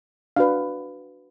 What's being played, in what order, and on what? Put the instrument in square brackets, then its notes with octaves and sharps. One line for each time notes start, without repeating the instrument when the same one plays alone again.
[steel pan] D4 F#4 B4 F5